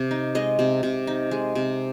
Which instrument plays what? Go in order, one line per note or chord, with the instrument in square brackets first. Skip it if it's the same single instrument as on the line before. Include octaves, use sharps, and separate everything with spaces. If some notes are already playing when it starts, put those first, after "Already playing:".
Already playing: [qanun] C3
D#4
G#3 D#5
C3
C3
D#4
G#3
C3